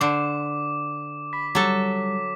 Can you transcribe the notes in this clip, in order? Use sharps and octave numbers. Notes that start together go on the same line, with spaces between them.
D3 C5 D6
B5 B6
F#3 G3 A4 D6